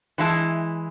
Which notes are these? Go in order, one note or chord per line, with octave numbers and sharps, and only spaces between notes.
E3 G#3 E4 A5